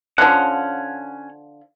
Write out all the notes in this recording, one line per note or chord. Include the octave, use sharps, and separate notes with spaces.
D3 F3 C#4 F#5